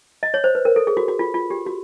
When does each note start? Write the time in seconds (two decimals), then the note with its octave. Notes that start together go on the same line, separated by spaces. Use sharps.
0.23 D#5
0.34 C#5
0.44 C5
0.55 B4
0.65 A#4
0.76 A4
0.87 G#4
0.97 F#4
1.08 F#4
1.19 F4
1.34 F4
1.50 G4
1.66 F#4